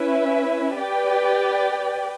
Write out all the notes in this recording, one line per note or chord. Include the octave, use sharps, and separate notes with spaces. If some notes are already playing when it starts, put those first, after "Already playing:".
Already playing: C#4 E4 B4 E5
G4 B4 D5 G5